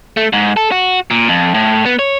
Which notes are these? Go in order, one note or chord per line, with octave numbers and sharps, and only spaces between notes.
A3
G#2
A4
F#4
A#2
F2
A2
B3
C#5